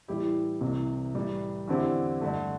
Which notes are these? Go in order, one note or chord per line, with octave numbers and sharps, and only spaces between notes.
A2 E3 G3 E4 G4
C2 C3 E3
A2 E3 G3
E2 D3 C4 E4 G4
G2 D3 A3